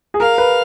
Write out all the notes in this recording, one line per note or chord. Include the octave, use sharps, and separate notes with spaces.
G#4
A#4 F5
B4